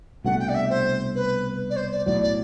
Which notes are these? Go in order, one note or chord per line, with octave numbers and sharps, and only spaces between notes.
C2 B2 A3 D4 F#5
G5
D5
E5
C5
B4
D5
C5
D5
B1 A2 F#3 D5
D5